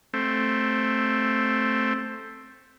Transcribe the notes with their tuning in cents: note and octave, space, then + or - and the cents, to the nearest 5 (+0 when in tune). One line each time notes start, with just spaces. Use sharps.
A3 +0 C4 +5